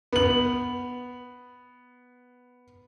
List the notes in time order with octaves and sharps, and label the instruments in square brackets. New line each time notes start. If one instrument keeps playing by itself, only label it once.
[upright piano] B3 F#7